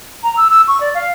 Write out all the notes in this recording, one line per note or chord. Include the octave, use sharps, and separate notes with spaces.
A#5
E6
E6
C#6
D5
F5